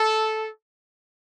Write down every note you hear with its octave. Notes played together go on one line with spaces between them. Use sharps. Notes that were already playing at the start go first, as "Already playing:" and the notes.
Already playing: A4